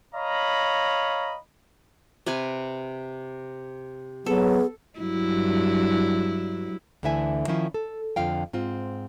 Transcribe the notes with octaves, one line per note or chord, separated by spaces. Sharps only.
C#5 D#5 F5 A#5 B5
C3 B4 G#5
F#3 B3 G#4 A4
G2 F#3 E4
D2 D3 E3 E4 E5 G#5
D#3 F3 C#4 E4 F4
A4
F2 D3 F4 F5 G5
G#2 C4 F4